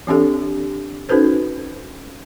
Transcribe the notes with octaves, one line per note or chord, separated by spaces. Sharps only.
E3 C4 D4 G4 A4
C#4 D#4 F#4 A4 B4 C5